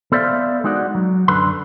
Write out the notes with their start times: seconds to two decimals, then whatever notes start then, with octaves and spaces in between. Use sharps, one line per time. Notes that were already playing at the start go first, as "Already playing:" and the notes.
0.12 B3 A4 C5 D5 E5 F5
0.64 G#3 D#4 F#4 D5 F#5
0.95 F#3
1.28 F#2 D3 B4 C6